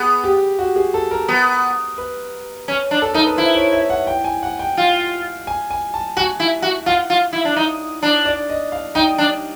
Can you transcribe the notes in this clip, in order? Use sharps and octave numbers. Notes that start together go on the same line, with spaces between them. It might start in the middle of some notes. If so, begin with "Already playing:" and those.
Already playing: B3 G#4
G4
F#4
G#4
A4
A#4
B3
B4
C#4
D4
A4
D#4 A#4
B4
E4 C5
C#5
E5
F#5
G5
G#5
F#5
G5
F4
G#5
G#5
A5
F#4 G#5
E4
F#4
F4 F#5
F4
E4
D4
D#4
D4
D5
D#5
F5
D#4 G5
D4